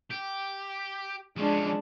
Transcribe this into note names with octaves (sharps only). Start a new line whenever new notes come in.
G4
F3 G#3 C#4 D4